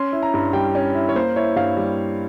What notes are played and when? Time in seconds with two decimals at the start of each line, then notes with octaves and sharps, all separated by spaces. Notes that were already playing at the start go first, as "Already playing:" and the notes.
Already playing: C#4 C6
0.13 E4
0.22 A#5
0.34 G2
0.53 G3 G5
0.75 C#4
0.95 E4
1.09 C#5
1.15 A#3 C5
1.36 E4 C#5
1.56 G2 F5
1.77 G3